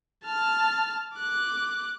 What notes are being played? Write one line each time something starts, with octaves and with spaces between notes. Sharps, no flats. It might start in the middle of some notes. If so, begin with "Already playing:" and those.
A5 F6
D6 F#6